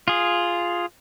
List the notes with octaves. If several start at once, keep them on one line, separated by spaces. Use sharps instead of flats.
F4 G#4